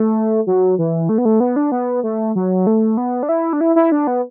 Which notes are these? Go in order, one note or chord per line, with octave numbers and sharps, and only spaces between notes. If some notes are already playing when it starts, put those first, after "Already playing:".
Already playing: A3
F#3
E3
A3
B3
A3
B3
D4
B3
A3
F#3
A3
B3
D4
E4
D4
E4
E4
D4
B3